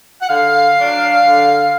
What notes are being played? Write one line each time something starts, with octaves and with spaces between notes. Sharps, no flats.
F#5
D3 F5
F#3 D4
D3